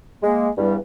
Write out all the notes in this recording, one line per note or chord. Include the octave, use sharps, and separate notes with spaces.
G#3 A#3
E2 G2 G3